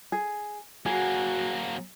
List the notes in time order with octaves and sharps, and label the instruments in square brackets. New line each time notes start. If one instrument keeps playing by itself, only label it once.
[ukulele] G#4
[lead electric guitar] F#3 A#3 [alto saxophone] F#4 [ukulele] G#4